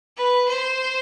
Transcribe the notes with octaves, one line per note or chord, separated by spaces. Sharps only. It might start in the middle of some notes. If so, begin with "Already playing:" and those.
B4
C5